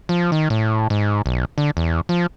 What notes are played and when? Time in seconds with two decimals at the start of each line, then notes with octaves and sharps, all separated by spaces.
0.09 F3
0.32 D#3
0.50 A2
0.90 G#2
1.26 B1
1.58 D3
1.77 E2
2.09 F3